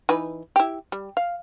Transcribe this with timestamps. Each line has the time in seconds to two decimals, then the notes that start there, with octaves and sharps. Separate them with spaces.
0.09 E3 D#4 B4
0.56 E4 G4
0.92 G3
1.17 F5